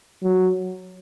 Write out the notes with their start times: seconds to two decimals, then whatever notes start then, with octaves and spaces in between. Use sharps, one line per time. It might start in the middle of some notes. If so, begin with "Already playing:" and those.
0.23 F#3